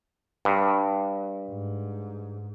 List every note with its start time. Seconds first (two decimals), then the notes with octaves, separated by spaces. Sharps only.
0.45 G2
1.49 G#2